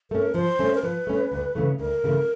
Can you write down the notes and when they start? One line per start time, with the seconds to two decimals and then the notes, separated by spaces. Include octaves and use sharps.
0.11 A3 C#4 A#4
0.34 F3 C5
0.59 A3 C#4
0.75 A#4
0.83 F3 B4
1.07 A3 C#4
1.32 D2
1.55 C#3 E3 A3
1.79 D2 A#4
2.04 C#3 E3 A3